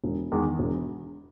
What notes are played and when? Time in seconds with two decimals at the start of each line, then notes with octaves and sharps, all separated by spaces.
0.04 E1
0.32 E2 D#3 G#3
0.59 E1